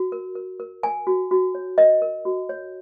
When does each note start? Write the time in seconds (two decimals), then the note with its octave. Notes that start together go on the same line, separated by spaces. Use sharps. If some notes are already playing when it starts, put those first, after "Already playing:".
Already playing: F#4
0.12 A#4
0.35 A#4
0.60 A#4
0.83 A#4 G#5
1.07 F#4
1.31 F#4
1.55 C#5
1.78 A#4 D#5
2.02 A#4
2.25 F#4
2.49 C#5